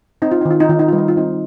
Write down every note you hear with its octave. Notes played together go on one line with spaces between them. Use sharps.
C4 D#4
F4
D#3 D#4
F4
D#4
D#3 F4
D#4
G3 F4
D#4
F4
C4 D#4